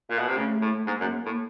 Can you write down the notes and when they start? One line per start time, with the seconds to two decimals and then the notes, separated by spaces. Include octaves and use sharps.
0.10 A#2
0.18 B2
0.27 C3
0.36 C#3 A3
0.61 A2
0.86 G#2 A#3
1.00 F#2
1.13 A#3
1.25 A2